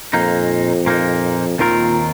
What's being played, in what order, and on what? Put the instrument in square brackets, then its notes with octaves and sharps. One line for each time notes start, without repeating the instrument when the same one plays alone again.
[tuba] F2 [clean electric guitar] A#2 A#3 D#4
[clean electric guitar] A#2 A#3 D#4
[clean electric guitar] D#2 D#3 C4 F4 A#4 [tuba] A#2